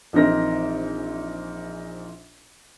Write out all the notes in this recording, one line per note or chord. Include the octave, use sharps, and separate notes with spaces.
A#1 E3 C4 D#4 A#4 A#6